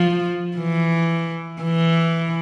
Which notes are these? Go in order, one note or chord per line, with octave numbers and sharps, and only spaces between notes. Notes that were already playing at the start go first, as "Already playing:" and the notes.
Already playing: F3
E3
E3